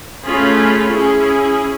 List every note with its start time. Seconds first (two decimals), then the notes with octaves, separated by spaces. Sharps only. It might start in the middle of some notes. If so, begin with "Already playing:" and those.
0.23 A3 C#4 F4 G#4 B5
0.88 C#4 E4 G#4